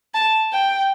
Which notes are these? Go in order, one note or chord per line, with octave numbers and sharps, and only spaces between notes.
A5
G5